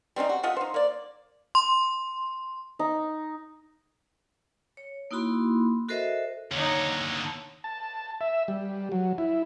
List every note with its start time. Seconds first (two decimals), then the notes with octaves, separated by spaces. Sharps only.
0.16 G3 C4 C#4 D#4
0.29 F#4
0.43 A3 F4 D#5 F#5
0.57 D#4 C5
0.74 A#3 D5
1.55 C6
2.79 D#4
4.77 C#5
5.11 A#3 D#4 E4 F#4 B5 C6
5.88 F#4 A4 A#4 C5 D#5 E5
6.52 D#2 D3 D#4 C#5
7.64 A5
8.21 E5
8.48 G3
8.92 F#3
9.18 E4